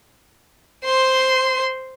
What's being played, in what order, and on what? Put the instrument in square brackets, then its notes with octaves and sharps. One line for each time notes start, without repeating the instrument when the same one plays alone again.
[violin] C5 C6